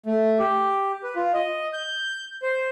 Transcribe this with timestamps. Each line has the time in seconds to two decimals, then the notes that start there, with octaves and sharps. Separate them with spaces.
0.06 A3
0.39 G4
1.03 B4
1.16 F4
1.34 D#5
1.73 G6
2.42 C5